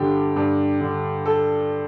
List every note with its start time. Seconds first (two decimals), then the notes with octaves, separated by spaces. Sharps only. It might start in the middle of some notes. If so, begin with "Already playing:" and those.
Already playing: G2 D3 G4
0.36 G2
0.81 D3
1.26 A4